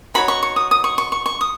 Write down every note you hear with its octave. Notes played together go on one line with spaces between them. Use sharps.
D#4 F#4 C#5 B5
C#6
C#6
D#6
D#6
C#6
C#6
C#6
C#6
D#6